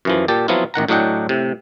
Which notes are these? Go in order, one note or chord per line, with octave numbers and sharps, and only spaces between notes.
F#2 E3 F3
A#2 G4 A5
F3 F#3 B3 C4 E4 F4
A1 D#3 F#5 A#5
A2 F#3 D4 D#5 F#5 G5
A2 C3